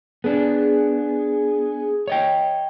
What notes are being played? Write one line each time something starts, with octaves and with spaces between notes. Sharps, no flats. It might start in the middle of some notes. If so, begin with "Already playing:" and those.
B3 D4 G#4
C#5 D#5 G5